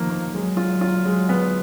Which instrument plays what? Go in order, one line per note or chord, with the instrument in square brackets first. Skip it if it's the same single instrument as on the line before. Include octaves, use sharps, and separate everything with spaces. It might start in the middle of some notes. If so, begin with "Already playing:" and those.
Already playing: [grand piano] D#3 A#3 [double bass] F3
[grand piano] A#3
[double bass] F#3 [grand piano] G#3
[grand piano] F4
F4
G#3
B3